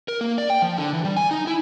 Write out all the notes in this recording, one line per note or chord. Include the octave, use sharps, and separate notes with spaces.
A#4
A#3
D5
G5
F3
D3
E3
G3
G#5
D#4
E4